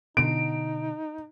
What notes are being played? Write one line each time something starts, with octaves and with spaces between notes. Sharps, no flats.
B2 D3 D#4 D7